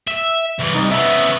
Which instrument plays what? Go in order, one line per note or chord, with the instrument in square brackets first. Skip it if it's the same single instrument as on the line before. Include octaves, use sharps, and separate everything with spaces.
[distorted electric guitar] E5
C2 E3
[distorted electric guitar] C2 [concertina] D#4
[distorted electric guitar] C#3 B3 [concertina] E5